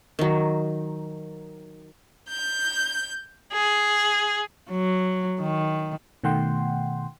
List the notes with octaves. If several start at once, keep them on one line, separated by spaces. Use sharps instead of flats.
D#3 F#3
G6
G#4
F#3
D#3
B2 D#3 A3 F#5 G5 C6